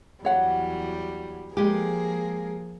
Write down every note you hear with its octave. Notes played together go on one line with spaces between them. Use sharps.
E2 F#3 G3 C#5 F#5
F3 G#3 A#3 G4 G#4